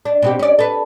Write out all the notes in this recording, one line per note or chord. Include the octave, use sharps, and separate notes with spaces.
D4
B2 C4 G4
C#4 D5
A4 B4